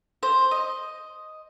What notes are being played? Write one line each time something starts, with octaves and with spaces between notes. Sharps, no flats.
C5
D#5